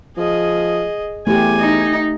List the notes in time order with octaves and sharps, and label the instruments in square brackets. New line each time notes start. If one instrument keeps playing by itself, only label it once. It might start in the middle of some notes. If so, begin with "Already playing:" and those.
[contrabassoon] F3 [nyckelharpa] G#4 D#5
[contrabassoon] E2 [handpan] A3 G4 [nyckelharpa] G#5
[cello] D#4